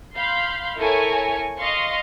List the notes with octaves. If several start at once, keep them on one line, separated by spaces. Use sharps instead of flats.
F5 B5 C6 G6
E4 A4 A#4 C#5 G#5 C#6
D#5 F5 C6 C#6